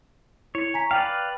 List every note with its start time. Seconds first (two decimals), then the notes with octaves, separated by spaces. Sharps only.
0.55 E4 C#5
0.74 G#5 A#5 B6
0.91 B4 D5 F5 G5